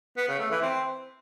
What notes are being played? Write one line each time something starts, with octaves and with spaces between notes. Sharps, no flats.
B3
C#3
A3
E3
C4